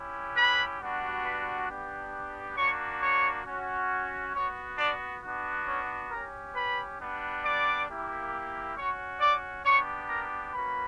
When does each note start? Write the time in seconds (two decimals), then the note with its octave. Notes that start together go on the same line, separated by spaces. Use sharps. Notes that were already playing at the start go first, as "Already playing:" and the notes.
Already playing: C#4 E4 G4
0.36 B4 B5
0.80 G3 B3 D4 F#4
1.24 B4 B5
1.68 B3 D4 G4
2.57 A#3 D4 F#4 C#5 C#6
3.01 C#5 C#6
3.45 C#4 F#4
4.34 B3 F#4 C#5 C#6
4.78 D4 D5
5.23 B3 D4 F#4
5.66 C#4 C#5
6.10 C#4 G4 A#4 A#5
6.55 B4 B5
7.00 G3 B3 D4
7.44 D5 D6
7.88 A#3 E4 G4
8.76 C#4 F#4 C#5 C#6
9.20 D5 D6
9.65 B3 D4 G4 C#5 C#6
10.09 A#4 A#5
10.53 A#3 C#4 F#4 B4 B5